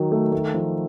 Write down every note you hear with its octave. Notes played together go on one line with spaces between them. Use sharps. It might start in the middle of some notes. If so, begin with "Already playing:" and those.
Already playing: D#3 F#3
A3
A3
F3